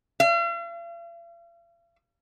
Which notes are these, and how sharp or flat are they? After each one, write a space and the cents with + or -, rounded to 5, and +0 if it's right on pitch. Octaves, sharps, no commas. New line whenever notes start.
F5 -45